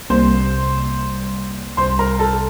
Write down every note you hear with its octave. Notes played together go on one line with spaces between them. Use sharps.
C2 C3 G3 A#3 C5 C6
C2 C3 G3 C5 C6
A#4 A#5
A4 A5